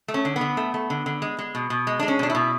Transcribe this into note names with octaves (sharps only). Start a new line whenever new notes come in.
A3
C#4
D3
B3
D3
A3
A3
D3
D3
G#3
G#3
B2
B2
G#3
G#3 D4
C#4
B2 D4
E4
B2